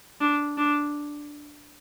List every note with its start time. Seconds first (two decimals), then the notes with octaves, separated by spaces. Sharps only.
0.21 D4
0.58 D4